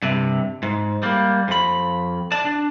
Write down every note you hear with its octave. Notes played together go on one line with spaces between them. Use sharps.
G2 C3
G#2
G3 A#3
F2 B5
D5 A5
D4